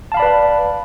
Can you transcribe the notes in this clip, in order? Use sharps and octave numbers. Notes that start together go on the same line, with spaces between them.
B4 D5 F5 A5 B5